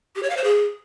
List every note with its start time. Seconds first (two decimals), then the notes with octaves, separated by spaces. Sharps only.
0.16 G4
0.23 C#5
0.30 F5
0.37 C5
0.44 G#4